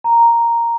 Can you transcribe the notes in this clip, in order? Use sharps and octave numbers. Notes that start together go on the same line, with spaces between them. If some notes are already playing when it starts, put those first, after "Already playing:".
A#5